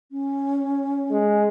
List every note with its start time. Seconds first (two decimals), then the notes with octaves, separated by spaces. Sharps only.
0.11 C#4
1.11 G#3